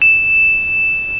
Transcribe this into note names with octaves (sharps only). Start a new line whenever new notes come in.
E7